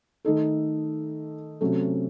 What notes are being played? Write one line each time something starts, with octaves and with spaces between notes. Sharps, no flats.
D#3 A3 D#4 A4
C3 F#3 A3 C#4